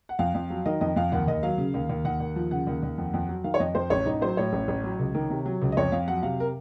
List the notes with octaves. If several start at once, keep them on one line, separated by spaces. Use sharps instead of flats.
F#5
F2 F5
F2
F#3
D#3 D#5
F2 D#5
F2 F5
D#2 F#5
D#2 D#5
F#3 F5
C#3
D#2
D#2
D#2 F#5
D#2
F3
C#3 F#5
D#2
D#2
F2
F2
F#3
D#3 F5
C#5
F2 D#5
F2 C5
A1 C#5
A1 D#4
F#3 C5
A2 C#5
A1
A1
F#3
C#2
D#3
C3
F#3
C#2
D#5
F2 C#5
F2 F5
F#3 F#5
C3 F5
A#4